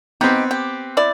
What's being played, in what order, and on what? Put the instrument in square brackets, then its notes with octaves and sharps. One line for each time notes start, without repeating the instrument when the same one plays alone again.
[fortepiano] B3 C4 [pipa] D#4 G4
[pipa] G4
E4 D5